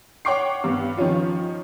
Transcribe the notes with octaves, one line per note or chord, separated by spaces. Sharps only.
C#5 F#5 G5 C#6 D6 C7
G2 B3
D#3 F3 C#4 F4